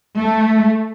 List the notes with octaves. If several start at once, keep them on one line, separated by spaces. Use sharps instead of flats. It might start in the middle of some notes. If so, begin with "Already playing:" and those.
A3